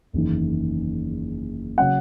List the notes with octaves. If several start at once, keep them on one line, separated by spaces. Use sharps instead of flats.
F#1 E2 D#3
C#3 F#3 C#4 F#5